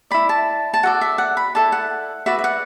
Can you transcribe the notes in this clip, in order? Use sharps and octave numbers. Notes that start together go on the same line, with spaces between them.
E4 D5 B5
A5
A5
F#4 A4 D5 F#5
E5
F#5
B5
E4 A4 D5 A5
F#5
F#4 B4 D5 E5
E5
F#5